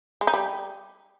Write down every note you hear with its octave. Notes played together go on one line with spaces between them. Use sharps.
G#3
D#4
G3